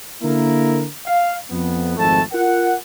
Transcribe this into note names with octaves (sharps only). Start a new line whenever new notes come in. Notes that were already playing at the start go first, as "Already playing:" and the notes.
D3 A#3 E4 A#4
F5
F2 B3
G#1 F2 A3 A4 A5
F4 A#4 F#5